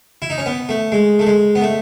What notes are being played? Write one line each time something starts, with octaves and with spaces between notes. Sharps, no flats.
E4
D#4
C#4
B3
A3
G#3
A3
G#3
B3
A3